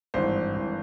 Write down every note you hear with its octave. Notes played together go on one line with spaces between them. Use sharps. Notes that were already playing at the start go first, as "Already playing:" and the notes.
G#1 G2 E3 C5
G#1 E3